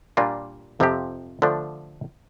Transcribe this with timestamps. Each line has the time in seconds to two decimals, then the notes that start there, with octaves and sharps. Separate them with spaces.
0.17 A#2 G3 A#3 D4 F4
0.80 F2 C3 F3 C4 G4
1.42 D3 F3 A3 D4